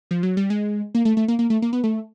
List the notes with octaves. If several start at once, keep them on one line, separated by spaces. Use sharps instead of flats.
F3
F#3
G3
G#3
A#3
A3
A3
A#3
A#3
A3
A#3
B3
A3